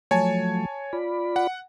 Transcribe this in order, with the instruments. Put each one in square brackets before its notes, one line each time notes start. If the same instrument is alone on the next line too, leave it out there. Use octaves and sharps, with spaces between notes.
[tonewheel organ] F3 F#3 A3 [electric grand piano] C#5 G#5 A5
[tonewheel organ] F4 D5 B5
[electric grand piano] F#5